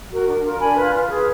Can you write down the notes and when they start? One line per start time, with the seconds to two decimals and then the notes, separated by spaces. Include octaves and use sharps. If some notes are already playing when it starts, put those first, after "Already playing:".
0.10 F#4 A#4
0.27 D4
0.43 F4 A#4
0.59 D4 G#5 B5
0.76 F4 B4
0.93 F4
1.09 G#4 B4